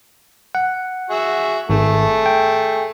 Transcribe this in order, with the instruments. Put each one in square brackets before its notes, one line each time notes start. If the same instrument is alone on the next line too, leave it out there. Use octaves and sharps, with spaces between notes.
[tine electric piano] F#5
[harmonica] F#4 G#4 E5
[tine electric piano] G#1 [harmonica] A3 G#4
[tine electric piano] G5